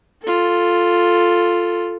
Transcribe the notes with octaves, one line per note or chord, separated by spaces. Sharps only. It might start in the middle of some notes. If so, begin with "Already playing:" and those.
F4 A4